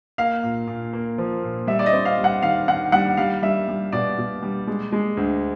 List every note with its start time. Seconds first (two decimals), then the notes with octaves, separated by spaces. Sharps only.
0.18 A#3 F5
0.43 A#2
0.67 A#2
0.93 A#3
1.18 F3
1.44 A#2
1.67 G3 E5
1.79 D5
1.86 D#5
1.93 C4
2.05 F5
2.18 G3
2.24 F#5
2.42 D#3 F5
2.68 D#3 F#5
2.92 G3 F#5
3.17 G3 F5
3.42 G3 E5
3.68 G3
3.92 B2 D5
4.18 B2
4.43 G3
4.67 G#3
4.93 G#3
5.17 D2